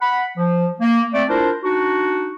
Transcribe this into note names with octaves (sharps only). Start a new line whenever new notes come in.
F#5 B5
F3
A#3
A3 C4 D5
D4 E4 F4 A#4 C5
D4 D#4 F#4